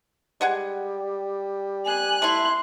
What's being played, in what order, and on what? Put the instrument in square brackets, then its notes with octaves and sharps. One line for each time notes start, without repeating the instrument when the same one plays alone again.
[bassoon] G3 [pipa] G#3 F#5 G#5
[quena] G#5 [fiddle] F#6
[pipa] A3 E4 [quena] C6